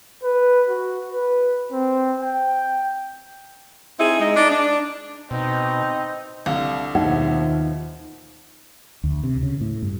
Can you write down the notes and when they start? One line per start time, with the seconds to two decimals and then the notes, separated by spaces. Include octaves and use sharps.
0.24 B4
0.69 F#4
1.11 B4
1.72 C4
2.21 G5
3.99 C4 D#4 E4 G#4
4.20 G#3 D#4
4.36 D4 D#4
4.50 D4
5.31 B2 C4 D#4
6.46 C2 D3 F5
6.95 D#2 B2 F3 D#4 E5 F#5
9.04 D2
9.23 C3
9.43 C#3
9.61 A2
9.82 G2